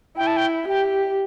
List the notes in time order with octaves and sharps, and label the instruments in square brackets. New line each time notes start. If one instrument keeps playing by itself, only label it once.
[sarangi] E4 [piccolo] G5
[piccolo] A5
G5
[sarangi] G4 [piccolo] G5